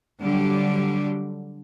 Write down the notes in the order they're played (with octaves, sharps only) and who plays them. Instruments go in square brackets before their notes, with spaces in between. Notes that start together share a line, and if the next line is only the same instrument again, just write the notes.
[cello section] D3 F#3 G3 G4